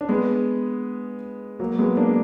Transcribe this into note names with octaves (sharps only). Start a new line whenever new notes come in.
D4
G#3 B3
F#3 A#3
G#3 B3
A#3 D4